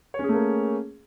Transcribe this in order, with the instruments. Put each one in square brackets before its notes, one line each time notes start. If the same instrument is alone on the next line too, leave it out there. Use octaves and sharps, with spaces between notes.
[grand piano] C#5
C#4
G#4
A3
A#3